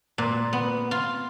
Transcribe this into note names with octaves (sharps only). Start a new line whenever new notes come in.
A#2
B3
F4